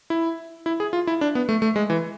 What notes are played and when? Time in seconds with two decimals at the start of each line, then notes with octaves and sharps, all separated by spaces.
0.10 E4
0.66 E4
0.80 G#4
0.93 F4
1.07 E4
1.21 D4
1.35 B3
1.49 A3
1.62 A3
1.76 G#3
1.90 E3